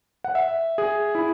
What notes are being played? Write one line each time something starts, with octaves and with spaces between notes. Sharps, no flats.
F#5
E5
G#4
E4